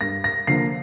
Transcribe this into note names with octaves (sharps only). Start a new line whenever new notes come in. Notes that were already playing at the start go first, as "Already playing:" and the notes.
G2 A#6
A#6
D3 F3 A#3 C7